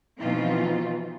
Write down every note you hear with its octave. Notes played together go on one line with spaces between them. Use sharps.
B2 E3 F3 C4 D#4 F4